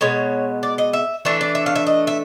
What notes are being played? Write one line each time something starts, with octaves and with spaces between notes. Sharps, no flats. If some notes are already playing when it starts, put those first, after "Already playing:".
B2 G#3 B3 C#5
D5
D#5
E5
E3 A3 D4 E5
D5
E5
F5
E5
D#5
E5